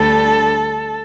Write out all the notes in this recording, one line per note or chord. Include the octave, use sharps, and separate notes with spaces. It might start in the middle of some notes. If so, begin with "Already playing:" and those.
Already playing: D2 D3 G3 A4